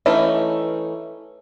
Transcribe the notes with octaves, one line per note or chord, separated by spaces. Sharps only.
E3 A3 C#4 D#4